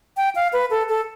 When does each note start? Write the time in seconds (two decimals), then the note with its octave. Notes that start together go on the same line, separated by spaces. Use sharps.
0.17 G5
0.35 F5
0.53 B4
0.71 A4
0.89 A4